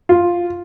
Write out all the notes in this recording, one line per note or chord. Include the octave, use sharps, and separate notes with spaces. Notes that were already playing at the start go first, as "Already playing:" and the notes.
F4